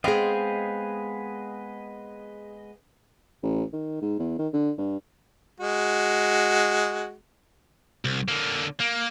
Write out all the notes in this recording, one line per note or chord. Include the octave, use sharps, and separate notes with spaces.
G#3 B3 C4 G#4 D#5 F5
A1
D#3
G#2
E2
D#3
D3
G2
G#3 F#4
C2
D3 A#3
A#3